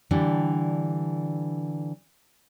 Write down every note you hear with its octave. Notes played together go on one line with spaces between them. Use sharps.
D3 E3 G3 D4